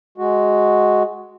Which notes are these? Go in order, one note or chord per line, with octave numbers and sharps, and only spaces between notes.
G#3 F#4